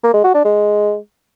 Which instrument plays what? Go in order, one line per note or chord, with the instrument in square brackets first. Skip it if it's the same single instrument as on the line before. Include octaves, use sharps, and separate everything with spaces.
[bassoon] A#3
G#3
F#4
D4
G#3